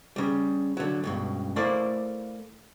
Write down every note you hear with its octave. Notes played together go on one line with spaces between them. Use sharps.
C#3 G3
D3 F#3
C#2 G2 B2
A3 A#3 E4 C5 D5